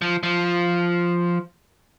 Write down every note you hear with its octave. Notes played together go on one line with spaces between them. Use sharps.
F3
F3